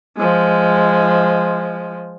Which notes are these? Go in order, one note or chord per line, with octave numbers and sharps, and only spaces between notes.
F3 G#3